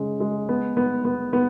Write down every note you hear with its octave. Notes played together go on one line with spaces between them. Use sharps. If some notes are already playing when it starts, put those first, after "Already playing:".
Already playing: C#3 G#3
G#3
B3
B3
B3
B3